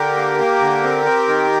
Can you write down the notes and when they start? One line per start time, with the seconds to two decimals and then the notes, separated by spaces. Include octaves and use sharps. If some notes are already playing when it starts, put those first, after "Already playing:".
Already playing: D3 G4 A#4
0.17 A#3
0.39 A#3
0.61 D3
0.83 C4
1.05 C4
1.28 D#3